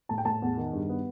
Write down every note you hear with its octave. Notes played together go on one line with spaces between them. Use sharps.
A2 A5
G5
A2 A5
E2
D#3
G2
B3